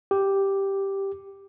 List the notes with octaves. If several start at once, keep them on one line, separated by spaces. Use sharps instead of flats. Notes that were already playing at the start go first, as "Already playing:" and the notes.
G4